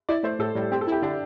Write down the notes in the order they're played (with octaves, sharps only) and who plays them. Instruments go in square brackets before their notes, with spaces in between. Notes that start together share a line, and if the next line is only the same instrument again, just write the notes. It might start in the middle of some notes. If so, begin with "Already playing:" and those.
[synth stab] E4 [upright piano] D5
[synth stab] A3 [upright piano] C5
[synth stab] A2 [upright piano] A4
[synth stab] A2 [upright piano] G3
[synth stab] C4 [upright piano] G4
[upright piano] A4
[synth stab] E4 [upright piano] G4
[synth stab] D3 [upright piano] D4